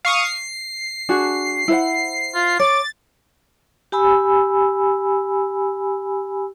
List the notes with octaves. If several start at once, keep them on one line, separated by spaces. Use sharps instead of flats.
F5 C#6 D#6
C7
D4 F#4 G#4
E4 C5 F#5
F4
C#5 D6 A6
G4 G#5 B5 E6